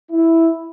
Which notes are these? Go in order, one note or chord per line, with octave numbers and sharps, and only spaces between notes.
E4